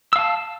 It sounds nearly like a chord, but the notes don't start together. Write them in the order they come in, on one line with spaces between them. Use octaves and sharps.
E6 F5 A5